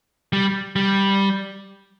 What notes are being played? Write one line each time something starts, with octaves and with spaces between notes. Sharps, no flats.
G3
G3